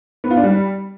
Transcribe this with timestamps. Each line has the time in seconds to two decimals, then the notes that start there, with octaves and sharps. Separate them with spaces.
0.24 B3
0.30 F4
0.37 D4
0.44 G3